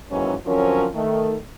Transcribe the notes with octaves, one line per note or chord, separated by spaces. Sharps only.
D#2 G#2 D#3 E3 F#3 C#4
D3 F3 F#3 C4 C#4 A#4
D#3 A3